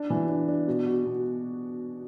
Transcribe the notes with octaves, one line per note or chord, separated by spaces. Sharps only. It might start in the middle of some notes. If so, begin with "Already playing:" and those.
Already playing: D4
E3
D4
D4
B2
F#4
B2